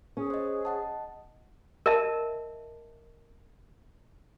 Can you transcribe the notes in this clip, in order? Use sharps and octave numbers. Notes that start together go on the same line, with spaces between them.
C#4 G#4
C5 D#5
D#5 F#5 A5
A#4 D#5 E5 A5